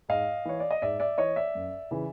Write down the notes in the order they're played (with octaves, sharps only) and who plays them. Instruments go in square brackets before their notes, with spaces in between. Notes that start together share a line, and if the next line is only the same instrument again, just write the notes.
[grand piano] G#2 D#5 F5
E3 C#5
D5
D#5
G#2 D5 E5
D5 E5
E3 C#5 D#5
D5 E5
F#2
C#3 E3